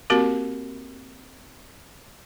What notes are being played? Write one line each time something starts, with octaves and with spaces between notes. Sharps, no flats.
A#3 C4 F#4 G4 A#4